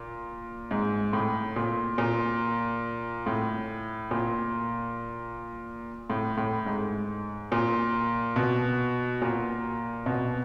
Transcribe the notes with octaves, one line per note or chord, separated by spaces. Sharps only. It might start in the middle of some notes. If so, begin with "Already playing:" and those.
Already playing: A#2
G#2
A2
A#2
A#2
A2
A#2
A2
A2
G#2
A#2
B2
A#2
B2